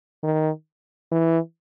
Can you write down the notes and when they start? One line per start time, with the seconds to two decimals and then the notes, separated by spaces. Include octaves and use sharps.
0.23 D#3
1.12 E3